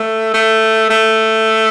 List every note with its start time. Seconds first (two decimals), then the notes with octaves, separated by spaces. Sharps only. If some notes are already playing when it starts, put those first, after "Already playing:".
Already playing: A3
0.34 A3
0.90 A3